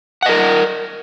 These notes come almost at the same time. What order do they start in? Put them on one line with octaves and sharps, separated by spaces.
F#5 D#5 A#4